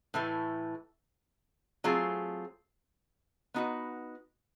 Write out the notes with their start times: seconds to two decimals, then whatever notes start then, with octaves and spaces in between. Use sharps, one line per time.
0.14 A2 E3 A3
1.84 F#3 A3 C4 F4 G#4
3.54 B3 D#4 F#4 B4